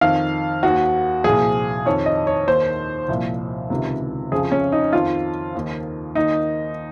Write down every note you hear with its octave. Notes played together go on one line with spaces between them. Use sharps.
F2 D#3 F5
D#2 D#3 F#4
C2 A#2 F3 G#4
F2 D#3 C#5
D#5
C#5
D#2 D#3 C5
C2 A#2 F3
C#2 C3 D#3
F2 C#3 F3 G#4
C#4
D#4
F2 D#3 F4
D#2 D#3
D#2 D#3 D#4